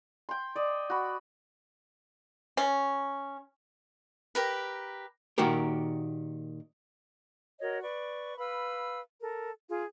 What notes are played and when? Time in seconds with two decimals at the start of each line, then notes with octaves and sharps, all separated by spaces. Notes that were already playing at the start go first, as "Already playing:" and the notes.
0.29 G5 C6
0.56 D5 D#5
0.90 F#4 B5
2.57 C#4
4.35 G4 A#4 B4
5.38 A#2 D#3 F#4 G4 A#4
7.61 F#4 A#4 C#5 D#5
7.82 B4 D5 C#6
8.38 B4 F5 B5 E6
9.21 A4 A#4
9.69 F4 G#4